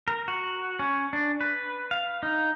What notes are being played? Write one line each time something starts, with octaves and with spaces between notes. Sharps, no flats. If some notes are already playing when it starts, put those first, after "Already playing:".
A#4
F#4
C#4
D4
B4
F5
D#4